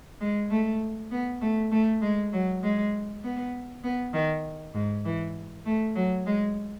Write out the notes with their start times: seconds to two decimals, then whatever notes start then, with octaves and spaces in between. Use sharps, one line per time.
0.21 G#3
0.50 A3
1.11 B3
1.42 A3
1.72 A3
2.02 G#3
2.33 F#3
2.63 G#3
3.23 B3
3.84 B3
4.14 D#3
4.75 G#2
5.05 E3
5.66 A3
5.95 F#3
6.27 G#3